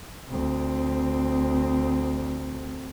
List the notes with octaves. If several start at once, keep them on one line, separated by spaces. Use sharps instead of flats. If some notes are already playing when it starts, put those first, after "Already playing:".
D2 C4